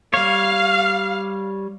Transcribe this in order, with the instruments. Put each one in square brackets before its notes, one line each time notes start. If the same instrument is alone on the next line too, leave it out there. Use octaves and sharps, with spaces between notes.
[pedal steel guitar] G3 C#5 [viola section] F5